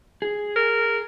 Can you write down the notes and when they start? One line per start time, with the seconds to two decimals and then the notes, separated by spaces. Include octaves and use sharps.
0.22 G#4
0.56 A#4